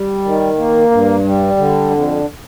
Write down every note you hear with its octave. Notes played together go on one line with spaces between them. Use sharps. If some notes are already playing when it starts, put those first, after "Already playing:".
Already playing: G3
D#3
A#3
G2
G3
D3
F2